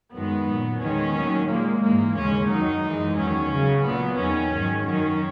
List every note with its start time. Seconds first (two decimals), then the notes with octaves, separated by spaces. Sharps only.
0.14 F#2 D#3 G#3 B3
0.48 A#2 F#3
0.81 E2 D#3 G#3 C#4
1.15 D#2 D#3 F#3
1.48 A#2 G#3 A#3
1.82 G#2 E3 G#3 A#3
2.16 D#2 C#3 G#3 C#4
2.49 F#2 D#3 F#3 D#4
2.84 F#2 E3 G#3
3.17 E2 D#3 F#3 C#4
3.51 C#2 C#3 F#3
3.84 A#2 F#3 B3
4.17 E2 D#3 F#3 C#4
4.52 G#2 D#3 F#3
4.85 F#2 D#3 F#3 C#4